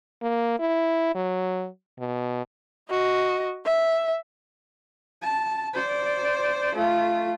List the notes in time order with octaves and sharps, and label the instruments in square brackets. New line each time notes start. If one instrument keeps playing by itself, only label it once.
[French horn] A#3
E4
F#3
B2
[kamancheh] F#4 D#5
E5
[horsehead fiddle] A5
C5 D5
A3 F4